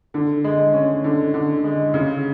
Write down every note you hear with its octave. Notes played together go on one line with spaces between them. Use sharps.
D3
G#3
C#4
D3
D3
G#3
C#3